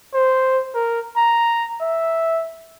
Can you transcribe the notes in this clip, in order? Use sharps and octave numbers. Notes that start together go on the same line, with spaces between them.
C5
A#4
A#5
E5